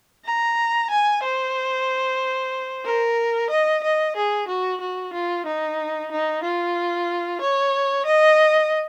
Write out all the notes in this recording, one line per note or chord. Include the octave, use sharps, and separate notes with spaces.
A#5
G#5
C5
A#4
D#5
D#5
G#4
F#4
F#4
F4
D#4
D#4
F4
C#5
D#5